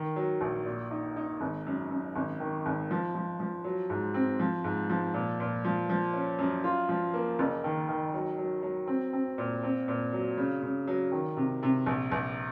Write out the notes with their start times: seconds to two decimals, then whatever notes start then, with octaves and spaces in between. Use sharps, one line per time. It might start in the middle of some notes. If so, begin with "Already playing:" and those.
Already playing: D#3
0.16 F#3
0.41 A#1
0.65 A#2
0.91 D#4
1.16 D#4
1.41 G#1
1.66 F#2
1.90 F#2
2.16 G#1
2.40 D#3
2.66 G#1
2.91 F3
3.15 F3
3.40 F3
3.64 F#3
3.90 G#2
4.14 C4
4.39 F3
4.64 G#2
4.90 F3
5.14 A#2
5.40 A#2
5.65 F3
5.89 F3
6.13 C#4
6.39 F#2
6.64 F4
6.89 F3
7.14 A#3
7.39 F#1
7.64 D#3
7.89 D#3
8.14 F#3
8.38 F#3
8.63 F#3
8.87 C4
9.13 C4
9.38 A#2
9.63 C4
9.88 A#2
10.13 F#3
10.37 C#3
10.63 C#3
10.87 F#3
11.12 D#3
11.37 C3
11.63 C3
11.86 A#1
12.12 A#1